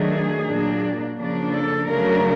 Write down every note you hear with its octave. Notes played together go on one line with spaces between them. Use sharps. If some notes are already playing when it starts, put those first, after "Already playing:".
Already playing: D#3 F#3 A3 D4 G#4
A#2 F#3 A#3 D4
C#3 F3 A#3 D4
A4
C#3 F#3 A3 D4 A#4